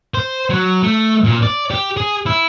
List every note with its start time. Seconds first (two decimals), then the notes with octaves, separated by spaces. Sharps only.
0.14 C5
0.50 F#3
0.83 A3
1.24 A#2
1.43 D5
1.71 G4
1.97 G#4
2.26 E4